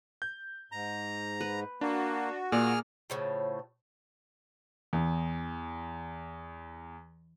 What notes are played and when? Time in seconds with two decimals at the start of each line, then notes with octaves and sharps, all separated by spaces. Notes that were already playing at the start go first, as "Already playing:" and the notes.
0.22 G6
0.72 G#2 A#5
1.41 B4
1.81 A#3 D4 F#4
2.52 A#2 A#3 G#4 D5 C6 F6
3.10 A2 C#3 F3
4.93 E2 E3